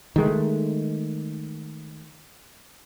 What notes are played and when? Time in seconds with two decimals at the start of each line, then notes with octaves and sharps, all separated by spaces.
0.16 D#3 G#3 A3